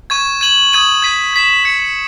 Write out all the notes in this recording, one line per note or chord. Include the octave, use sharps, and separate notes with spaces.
C#6 G#6 D#7
G#6 D#7 F#7
D#6 G#6 D#7 F#7
G#6 B6 D#7
G#6 B6 E7
G#6 C#7 F#7